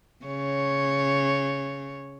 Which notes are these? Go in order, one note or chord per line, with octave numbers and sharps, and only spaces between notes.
C#3 C#5